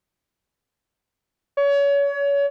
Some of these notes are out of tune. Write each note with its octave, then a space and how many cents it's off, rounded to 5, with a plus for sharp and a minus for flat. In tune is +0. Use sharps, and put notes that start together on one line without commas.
C#5 +30